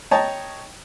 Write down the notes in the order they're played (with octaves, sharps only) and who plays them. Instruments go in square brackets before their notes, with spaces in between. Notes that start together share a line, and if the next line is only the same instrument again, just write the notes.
[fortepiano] C#5 D#5 G5 A5 A#5